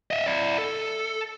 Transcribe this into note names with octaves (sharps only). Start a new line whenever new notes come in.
D#5 E5
E4 D5
A4